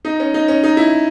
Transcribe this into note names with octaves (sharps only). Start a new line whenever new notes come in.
D#4
C#4
D#4
C#4
D#4
E4